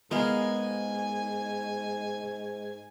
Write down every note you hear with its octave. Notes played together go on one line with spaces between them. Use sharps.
G#2 G#3 B3 A#4 F5 G#5